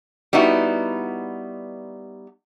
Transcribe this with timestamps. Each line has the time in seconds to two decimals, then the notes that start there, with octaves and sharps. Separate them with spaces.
0.33 G3 B3 D#4 E4 F#4